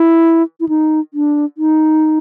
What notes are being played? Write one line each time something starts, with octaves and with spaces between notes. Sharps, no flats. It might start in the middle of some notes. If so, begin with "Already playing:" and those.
Already playing: E4
E4
D#4
D4
D#4